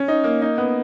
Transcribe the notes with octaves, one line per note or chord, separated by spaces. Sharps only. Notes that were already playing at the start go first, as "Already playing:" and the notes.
Already playing: C#4
D#4
A#3
D#4
B3